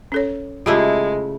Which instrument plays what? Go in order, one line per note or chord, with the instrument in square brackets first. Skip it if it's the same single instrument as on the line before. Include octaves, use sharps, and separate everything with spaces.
[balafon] C#4 A4 C#5
[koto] C#3 A3 E4 [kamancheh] G#3 [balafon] F4 G4